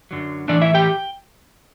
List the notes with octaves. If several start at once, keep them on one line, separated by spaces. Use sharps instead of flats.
F#2 D3 F#3
A2 E3 A3 D4 D5
E4 E5
G4 G5